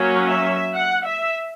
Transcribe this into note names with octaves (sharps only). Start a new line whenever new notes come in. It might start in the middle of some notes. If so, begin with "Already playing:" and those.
Already playing: F#3 A#3 C#4
E5
F#5
E5